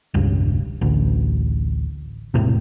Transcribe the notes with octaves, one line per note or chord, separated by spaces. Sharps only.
E1 C#2 G2
A1 D2
E1 A2 C3